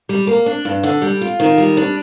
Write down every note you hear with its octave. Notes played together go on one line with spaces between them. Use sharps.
G3
A#3
D4
G2
D3
G3
F4
D#3
G3
D4